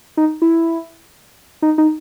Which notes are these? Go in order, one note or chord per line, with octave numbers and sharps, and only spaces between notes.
D#4
E4
D#4
D#4